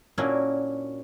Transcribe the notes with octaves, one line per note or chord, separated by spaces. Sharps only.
A#2 C#4 D4 E4 F#4 A#4